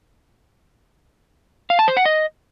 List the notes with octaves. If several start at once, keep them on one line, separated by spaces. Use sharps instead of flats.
F5
A5
C5
F#5
D#5